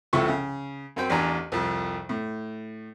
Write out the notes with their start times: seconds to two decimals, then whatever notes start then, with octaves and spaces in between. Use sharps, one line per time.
0.13 C#2 C3 F3 E4 A4 C#6
0.28 C#3
0.96 F#2 C4 G5
1.10 A1 E2 D4 G#5 A#5
1.52 C2 F2
2.09 A2